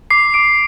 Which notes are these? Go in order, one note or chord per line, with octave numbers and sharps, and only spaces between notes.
D6 C7
D6 D7